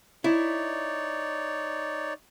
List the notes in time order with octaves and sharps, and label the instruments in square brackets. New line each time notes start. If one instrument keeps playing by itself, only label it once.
[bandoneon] D#4 C#5 D5 [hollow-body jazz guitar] E4